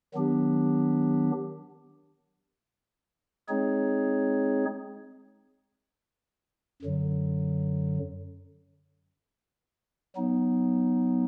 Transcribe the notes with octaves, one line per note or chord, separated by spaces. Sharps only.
D#3 F#3 B3 D4 G4
G#3 C4 D#4 G#4 C#5
F#2 D3 F#3
F#3 B3 D#4